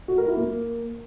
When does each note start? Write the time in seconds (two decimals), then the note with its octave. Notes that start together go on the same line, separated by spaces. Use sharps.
0.08 F#4
0.18 A#4
0.27 E4
0.37 A#3